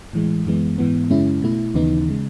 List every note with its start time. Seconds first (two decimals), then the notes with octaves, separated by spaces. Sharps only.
0.13 A2 E3 G#3
0.46 F#2 E3 G#3 B3
0.78 G#2 E3 B3
1.10 F#2 C#3 G#3 C#4 E4
1.42 B2 A3 E4
1.74 D#2 C#3 E3 B3 D#4
2.08 C#3 G#3